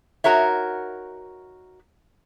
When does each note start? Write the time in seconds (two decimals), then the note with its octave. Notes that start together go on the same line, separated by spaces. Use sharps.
0.24 D#4 F#4 A#4 C#5 E5